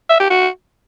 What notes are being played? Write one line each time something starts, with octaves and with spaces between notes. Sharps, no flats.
E5
G4
F#4